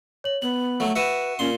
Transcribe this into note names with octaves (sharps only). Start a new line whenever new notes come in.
C#5 F#7
B3 F#7
F#3 A3
F#4 B4 E5 C#7 D#7 E7
A#2 C#4 C6